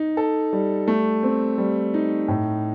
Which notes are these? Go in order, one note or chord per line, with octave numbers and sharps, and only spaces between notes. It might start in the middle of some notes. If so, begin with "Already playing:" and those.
Already playing: D#4
A4
G3
A3
C4
G3
D#4
A2